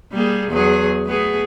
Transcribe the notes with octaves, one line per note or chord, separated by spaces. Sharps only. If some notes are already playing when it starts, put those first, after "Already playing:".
G3 A#3 G#4
E2 F#3 G#4
A3 B3 G#4